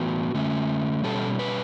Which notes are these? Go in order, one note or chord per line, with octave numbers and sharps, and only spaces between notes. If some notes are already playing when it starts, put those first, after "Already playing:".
Already playing: A2 E3 B3 F#4
D3 A3 C#4
B2 G3 C#4 A4
B4